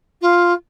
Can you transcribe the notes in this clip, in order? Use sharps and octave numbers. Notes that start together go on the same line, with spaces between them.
F4